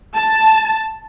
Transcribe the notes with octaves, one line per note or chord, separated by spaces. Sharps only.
A5